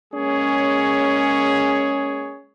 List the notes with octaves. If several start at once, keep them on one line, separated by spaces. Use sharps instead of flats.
G#3 A#3 C#4 G#4 C#5